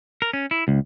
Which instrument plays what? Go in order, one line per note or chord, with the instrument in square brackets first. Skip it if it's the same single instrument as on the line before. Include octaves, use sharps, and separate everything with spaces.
[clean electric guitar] A#4
C#4
E4
C#2